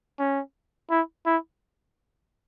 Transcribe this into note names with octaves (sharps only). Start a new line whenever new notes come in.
C#4
E4
E4